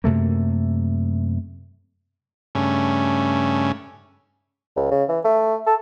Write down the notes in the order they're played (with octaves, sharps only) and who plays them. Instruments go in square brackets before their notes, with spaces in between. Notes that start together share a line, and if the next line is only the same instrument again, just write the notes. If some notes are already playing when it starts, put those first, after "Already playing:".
[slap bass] F#2 C3 A3 A#3
[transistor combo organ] G2 C#3 A3 C#4
[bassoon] C#2
C#3
E3
A3
A4